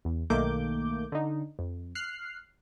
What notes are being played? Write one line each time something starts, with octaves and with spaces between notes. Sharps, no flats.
E2
B1 D#3 A3 A#3 D6 G6
D3 D#4
F2
F6 F#6 C7